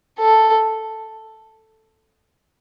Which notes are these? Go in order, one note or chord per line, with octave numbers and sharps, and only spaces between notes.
A4